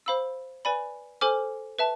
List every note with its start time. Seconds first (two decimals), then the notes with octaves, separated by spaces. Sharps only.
0.06 C5 F5 B5 E6
0.65 B4 D5 G#5 B5
1.21 A4 C5 G#5 D6 F6
1.79 B4 E5 A5